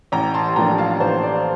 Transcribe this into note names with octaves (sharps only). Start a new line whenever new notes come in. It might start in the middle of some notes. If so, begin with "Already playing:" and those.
A1 G5 A#5
A5 C6
C6
A2 F3 A#3 D4 G5 A#5
F5 A5
A1 C5
D5